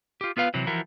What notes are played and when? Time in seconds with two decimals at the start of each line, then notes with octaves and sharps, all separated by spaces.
0.21 F4 G4
0.37 B3 F4 B4 F5
0.54 C3 E3 F#3
0.67 E3 F3 E4 F#4 A#4